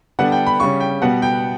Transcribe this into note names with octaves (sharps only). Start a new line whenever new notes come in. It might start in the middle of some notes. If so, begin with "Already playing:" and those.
D3 G3 B3 D4 F#5
G5
B5
C#3 G3 C#4 C#6
G5
B2 G3 B3 F#5
G5